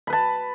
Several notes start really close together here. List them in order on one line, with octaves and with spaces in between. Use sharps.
B5 B4 A5